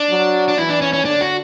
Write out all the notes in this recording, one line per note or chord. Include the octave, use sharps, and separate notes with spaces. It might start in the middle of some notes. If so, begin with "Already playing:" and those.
Already playing: D4
F#3
D4
E3 E4
D4
C#4
C#4
D3 D4
F#4